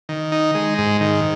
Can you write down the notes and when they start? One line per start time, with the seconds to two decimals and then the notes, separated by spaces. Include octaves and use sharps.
0.09 D#3
0.32 D#4
0.55 G#3
0.78 G#2
1.01 D#3